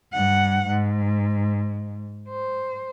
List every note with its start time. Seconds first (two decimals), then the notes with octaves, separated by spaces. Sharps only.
0.13 G2 F#5
0.68 G#2
2.29 C5